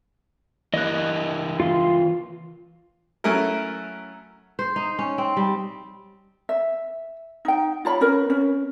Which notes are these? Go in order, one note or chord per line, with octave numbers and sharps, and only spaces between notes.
E3 A#3 D#5 F#6
F4 F5 C6
F#3 A3 C#4 E4 A#4
C5
D#4
C#4
C4
G3
E5
D#4 G5
F4 C#5 B5
C#4 A#4 B4
C#4